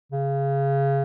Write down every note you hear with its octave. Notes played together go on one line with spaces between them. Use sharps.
C#3